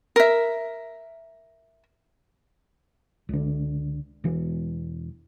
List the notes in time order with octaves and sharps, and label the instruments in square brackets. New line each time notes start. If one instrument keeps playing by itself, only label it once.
[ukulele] A#4 E5
[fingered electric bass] C#2 D3
E1 E3